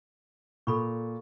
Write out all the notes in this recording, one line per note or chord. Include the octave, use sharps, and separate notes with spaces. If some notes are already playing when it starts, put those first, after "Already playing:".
A#2 A4 B5 C#6